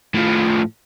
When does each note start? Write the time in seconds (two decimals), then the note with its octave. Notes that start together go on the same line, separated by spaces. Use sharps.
0.15 A2 F3